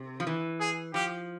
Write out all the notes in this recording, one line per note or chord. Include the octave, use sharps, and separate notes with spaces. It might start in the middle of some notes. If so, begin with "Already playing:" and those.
Already playing: C3
F3
E3
G#4
F3 G4